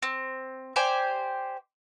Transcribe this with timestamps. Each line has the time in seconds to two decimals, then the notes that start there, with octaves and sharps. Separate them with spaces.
0.02 C4
0.76 G4 C5 D5 G#5